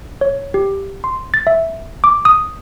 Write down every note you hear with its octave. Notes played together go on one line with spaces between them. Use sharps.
C#5
G4
C6
A6
E5
D6
D#6